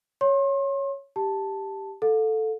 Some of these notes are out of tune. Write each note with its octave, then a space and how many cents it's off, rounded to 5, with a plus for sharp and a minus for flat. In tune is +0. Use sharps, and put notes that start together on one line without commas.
C#5 +0 C6 +40
G4 +0 A5 +0
A4 +0 F5 +45